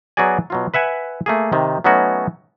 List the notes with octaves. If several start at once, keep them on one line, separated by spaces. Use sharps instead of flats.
F#3 B3 F#4 G#4 D5 G#5
B2 F#3 F4
B4 E5 F#5 G#5
A3 A#3 G#4
C3 D#3
F#3 A3 B3 C#4 D#4 F#4